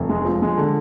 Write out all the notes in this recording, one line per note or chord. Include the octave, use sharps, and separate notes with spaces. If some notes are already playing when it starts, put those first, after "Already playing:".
Already playing: F1
G#3
F3
G#3
D3